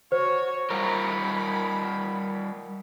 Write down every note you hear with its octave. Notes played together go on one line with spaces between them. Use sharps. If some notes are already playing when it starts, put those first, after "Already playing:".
F#4 C5 C#5
G3 F4 A#4 B5